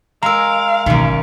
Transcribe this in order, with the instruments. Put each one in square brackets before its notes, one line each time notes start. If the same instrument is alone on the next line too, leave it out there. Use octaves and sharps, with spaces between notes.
[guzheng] G#3 A#4 [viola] F5 [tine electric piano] A#5 E6
[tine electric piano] A1 [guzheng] F#2 D#3 [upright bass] B2 A#3